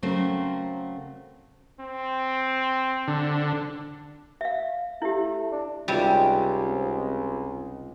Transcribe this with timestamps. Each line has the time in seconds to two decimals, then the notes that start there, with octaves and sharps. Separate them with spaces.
0.02 C#3 F#3 A3 C4 A#4 C5
1.80 C4
3.08 D3
4.41 E5 F5
5.02 A3 E4 G4
5.52 D4
5.88 C#2 C3 G3 D#4 F4 F#4
6.67 C4 C5